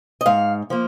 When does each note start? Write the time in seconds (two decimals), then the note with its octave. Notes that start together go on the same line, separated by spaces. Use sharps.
0.21 D#5
0.26 G#2 F5
0.70 F3 A#3